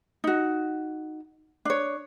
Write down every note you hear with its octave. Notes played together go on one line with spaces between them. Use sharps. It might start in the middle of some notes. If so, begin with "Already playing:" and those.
D#4 F#4
D4 C#5